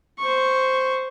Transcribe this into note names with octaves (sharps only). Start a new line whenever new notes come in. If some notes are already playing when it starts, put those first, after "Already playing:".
C5 C#6